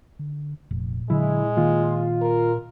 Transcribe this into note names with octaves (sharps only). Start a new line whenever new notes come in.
D3
F1 A#2
D3 F#3 G#3 E4
D#3 A#3 F4
A#4